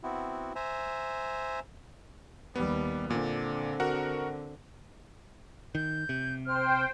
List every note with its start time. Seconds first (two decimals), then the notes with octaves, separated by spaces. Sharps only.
0.03 B3 C4 E4 F#4
0.56 C5 E5 G#5 A#5
2.55 D#2 G3 B3
3.10 A#2 D3 C4
3.80 F#4 A#4 F#5
5.75 D#3 G6
6.09 C3
6.46 C5 G5 F6